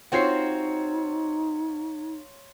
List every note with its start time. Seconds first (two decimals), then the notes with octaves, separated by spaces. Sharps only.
0.12 C4 D#4 F4 F#4 C#5 C7